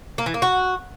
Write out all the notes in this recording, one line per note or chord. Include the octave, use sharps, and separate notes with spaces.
A#3
E3
A#3
F#4